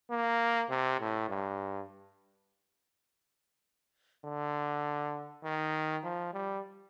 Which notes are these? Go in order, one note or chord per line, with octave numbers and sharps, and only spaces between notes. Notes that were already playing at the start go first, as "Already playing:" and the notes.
A#3
C3
A2
G2
D3
D#3
F3
G3